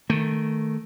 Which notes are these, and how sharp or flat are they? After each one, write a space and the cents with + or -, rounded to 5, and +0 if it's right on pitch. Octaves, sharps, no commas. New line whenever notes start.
D#3 +0 A3 +0